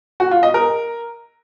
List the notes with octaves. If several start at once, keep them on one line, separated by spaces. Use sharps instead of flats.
F#4
F4
D#5
A#4